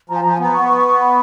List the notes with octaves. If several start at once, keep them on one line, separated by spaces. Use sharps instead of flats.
F3 A#5
G#5
F3 A#5
G#5
B3 A#5
C#6
C#6
C#6
C#6
B5